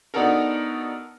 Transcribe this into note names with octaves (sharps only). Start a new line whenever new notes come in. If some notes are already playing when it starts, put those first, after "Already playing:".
B3 D4 D#4 F#4 A4 A#4